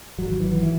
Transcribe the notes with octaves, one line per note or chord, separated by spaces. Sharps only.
G#1 F#3
E3
E3